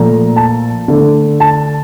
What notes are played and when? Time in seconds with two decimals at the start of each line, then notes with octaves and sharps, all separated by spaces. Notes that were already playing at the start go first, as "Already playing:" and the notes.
Already playing: A#2 F3 A3 A#5
0.36 A5
0.88 D3 A3
1.40 A5